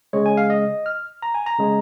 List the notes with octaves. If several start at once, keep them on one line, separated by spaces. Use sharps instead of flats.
C#3 G#3 C#5
G#5
F5
D#5
F6
A#5
G#5
A#5
C#3 G#3